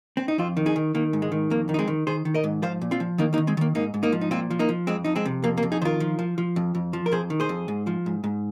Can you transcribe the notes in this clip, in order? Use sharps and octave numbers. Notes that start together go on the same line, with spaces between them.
C4
D#4
F2 C4 F4
D#3
D#4 G#4
D#3
D#3 A#3
G#2
G#3
D#3
F2 A#3
D#3
D#4
G#3 C4
D#3
D#3 G#4 C5
D#3
A#4 D#5
G#2
F3 C5 F5
A#2
C4 F4
F3
D#3 A#3 D#4
A#3 D#4
D#3
G#3 C4
D#3 A#3
G#2 A#3 D#4
G#2
A#3 D#4
F3
D#4
A#2 C4 F4
F3
A#3 D#4
F3
F2 G#3 C4
F2 D#4
G#3 C4
C3
F2 A#3
A#3
F2
D#4 G#4
D#3 F4 A#4 C5
F3
F3
F3
F2
F2
F3
A#4
F2 G#4 C5
D#3
G#4 C5
F2
G#2
F3
G#2
G#2